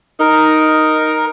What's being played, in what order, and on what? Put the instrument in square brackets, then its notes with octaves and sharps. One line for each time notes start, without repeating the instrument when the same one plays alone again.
[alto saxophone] D#4 [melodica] A#4